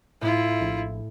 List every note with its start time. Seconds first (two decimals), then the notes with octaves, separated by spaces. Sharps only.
0.21 A2 E4 F4
0.61 A#1